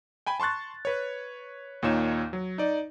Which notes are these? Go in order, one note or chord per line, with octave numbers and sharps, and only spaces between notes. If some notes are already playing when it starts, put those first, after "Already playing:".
G5 G#5 B5
A5 C6 C#6 F#6 A6
B4 C#5
D#2 A#2 D#4 C#5 E7
F#3
D#4 D5